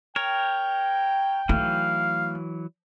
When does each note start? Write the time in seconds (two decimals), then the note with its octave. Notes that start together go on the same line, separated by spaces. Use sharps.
0.16 A#4 C#5 G5
1.49 E3 F#3 A3 D#4 F5